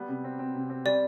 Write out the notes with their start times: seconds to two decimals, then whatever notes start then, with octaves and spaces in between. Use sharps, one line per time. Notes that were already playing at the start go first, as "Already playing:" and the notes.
Already playing: G3 B3
0.09 C3
0.24 C4
0.39 C4
0.55 C3
0.70 C4
0.85 G3 D5